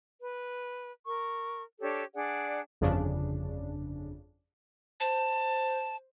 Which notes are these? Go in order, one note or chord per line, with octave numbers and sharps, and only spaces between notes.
B4
A#4 C#6
D4 G4 A4 C#5
D4 G#4 D5 F#5
G1 F2 C#3 D4
C5 A5